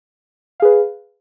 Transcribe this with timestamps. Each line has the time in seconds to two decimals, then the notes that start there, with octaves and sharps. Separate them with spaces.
0.60 F5
0.62 G#4
0.65 B4